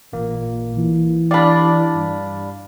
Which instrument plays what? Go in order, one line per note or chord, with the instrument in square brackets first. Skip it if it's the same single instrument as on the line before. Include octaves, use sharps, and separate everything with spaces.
[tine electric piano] A1 A#3 [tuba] A#2
[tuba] E3
[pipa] G3 D4 [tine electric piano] D5 F5 B5
[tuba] G2